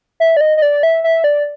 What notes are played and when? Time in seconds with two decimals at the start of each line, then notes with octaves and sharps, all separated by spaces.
0.20 E5
0.37 D5
0.41 D#5
0.57 D#5
0.62 D5
0.83 E5
1.04 E5
1.24 D5